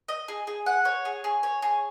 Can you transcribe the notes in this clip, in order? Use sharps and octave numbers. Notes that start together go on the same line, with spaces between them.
D#5
G#4
G#4
F#5
C#5
G#4
G#4
C#5
G#4